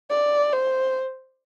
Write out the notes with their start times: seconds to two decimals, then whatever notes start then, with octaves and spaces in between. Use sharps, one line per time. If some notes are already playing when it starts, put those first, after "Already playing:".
0.10 D5
0.53 C5